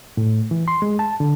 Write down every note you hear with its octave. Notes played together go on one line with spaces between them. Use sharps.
A2
E3
C6
G#3
A5
D3